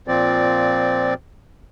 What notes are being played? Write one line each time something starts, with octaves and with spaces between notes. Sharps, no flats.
A#2 F3 C4 D5